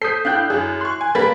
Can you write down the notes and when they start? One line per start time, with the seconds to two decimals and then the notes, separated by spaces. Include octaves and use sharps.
0.02 A4 C5 D#6 G6 B6 C7
0.25 D4 E4 F5 G5 F#6 G6
0.50 F#2 E4 G#4
0.81 C6 C#6 F#6
1.01 G#5
1.15 G3 A#3 A4 B4 B5 A6 B6